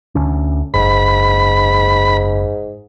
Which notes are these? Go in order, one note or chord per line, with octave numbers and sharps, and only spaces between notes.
D2 D3 C#4
F#1 G#2 B5